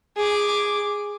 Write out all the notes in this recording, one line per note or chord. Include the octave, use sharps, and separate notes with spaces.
G#4 D6